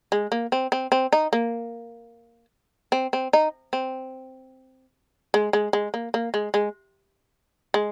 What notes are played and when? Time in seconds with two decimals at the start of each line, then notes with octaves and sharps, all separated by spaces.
0.12 G#3
0.32 A#3
0.52 C4
0.72 C4
0.92 C4
1.13 D#4
1.33 A#3
2.92 C4
3.13 C4
3.33 D#4
3.73 C4
5.34 G#3
5.53 G#3
5.73 G#3
5.94 A#3
6.14 A#3
6.34 G#3
6.54 G#3
7.74 G#3